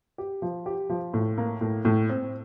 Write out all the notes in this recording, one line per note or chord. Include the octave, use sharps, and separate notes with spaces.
G4
F3
G4
F3
A2
A#3
A2
A2
C4